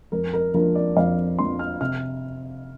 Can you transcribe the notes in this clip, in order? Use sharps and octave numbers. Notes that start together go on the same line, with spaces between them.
F2 A#4
A#4
F3 A#3 D4 A#4
D5
F2 F5
F3 A#3 D4 C6
F6
C3 F6